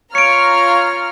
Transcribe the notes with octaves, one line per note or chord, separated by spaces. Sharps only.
F4 C#5 A#5 F6 C#7 D7